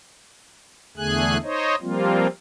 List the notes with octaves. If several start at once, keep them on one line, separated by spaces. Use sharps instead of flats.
E2 D3 A3 G#4 G#5 F#6
D#4 C5 C#5 D#5
F3 G3 A#3 C4 F4